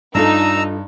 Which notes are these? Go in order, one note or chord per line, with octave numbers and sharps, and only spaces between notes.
G2 D4 D#4 F4 A4 A#5 E6